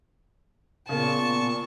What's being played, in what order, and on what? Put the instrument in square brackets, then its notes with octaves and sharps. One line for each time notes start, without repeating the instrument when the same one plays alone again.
[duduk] A#2 [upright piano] C#3 A#3 [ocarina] B3 [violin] A5 C#6